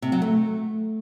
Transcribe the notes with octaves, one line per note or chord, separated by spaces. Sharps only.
C3
F#3
A3